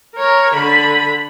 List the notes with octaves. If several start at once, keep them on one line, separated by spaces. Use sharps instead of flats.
A#4 C#5
D3 B5